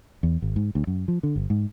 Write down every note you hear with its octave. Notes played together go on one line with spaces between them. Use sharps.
E2
G#1
G#2
D2
F#2
F3
D3
G1
G#2